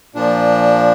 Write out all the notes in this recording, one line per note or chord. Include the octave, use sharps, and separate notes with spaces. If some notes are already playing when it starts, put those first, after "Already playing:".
A#2 F3 D4